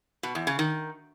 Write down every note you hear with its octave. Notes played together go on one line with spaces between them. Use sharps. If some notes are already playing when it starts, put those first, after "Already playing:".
B2
E2
C#3
D#3